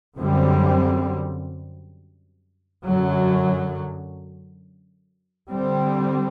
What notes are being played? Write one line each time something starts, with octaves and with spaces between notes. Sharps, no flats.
F#2 D3 G3 C4
F#2 D3 F#3
D3 G3 C4